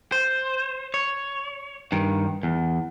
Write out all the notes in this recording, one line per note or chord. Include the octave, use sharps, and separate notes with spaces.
C5
C#5
G2 D#3
E2